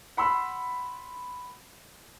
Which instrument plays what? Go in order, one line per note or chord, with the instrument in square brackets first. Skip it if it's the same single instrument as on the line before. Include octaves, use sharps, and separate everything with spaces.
[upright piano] F#5 B5 C6 E6